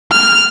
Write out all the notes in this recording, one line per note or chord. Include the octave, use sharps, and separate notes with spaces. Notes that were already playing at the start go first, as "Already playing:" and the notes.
F6